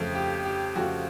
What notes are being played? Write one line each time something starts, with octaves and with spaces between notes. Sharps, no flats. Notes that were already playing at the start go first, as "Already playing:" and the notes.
Already playing: F2 C#3 F3 A3
G4
G4
F2 C#3 F3 A3 F#4